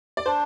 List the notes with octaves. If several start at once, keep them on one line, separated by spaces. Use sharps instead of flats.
D5
D4 C5